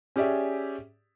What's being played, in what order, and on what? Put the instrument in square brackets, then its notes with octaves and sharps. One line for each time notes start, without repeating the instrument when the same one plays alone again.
[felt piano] C#4 G4 G#4 D5 E5